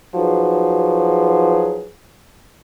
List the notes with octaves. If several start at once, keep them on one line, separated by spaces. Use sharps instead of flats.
F3 F#3 D#4 F#4 G#4 B4